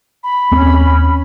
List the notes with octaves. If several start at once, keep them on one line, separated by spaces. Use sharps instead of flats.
B5
D#2 C4 C#4